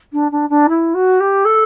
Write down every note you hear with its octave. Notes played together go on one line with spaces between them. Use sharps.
D4
D4
D4
E4
F#4
G4
A4